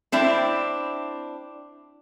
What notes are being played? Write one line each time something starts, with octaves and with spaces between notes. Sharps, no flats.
C4 D4 E4